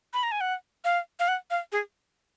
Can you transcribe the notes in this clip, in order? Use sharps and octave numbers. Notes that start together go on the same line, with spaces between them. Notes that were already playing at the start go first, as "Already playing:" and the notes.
B5
A#5
G#5
F#5
F5
F5
F#5
F5
G#4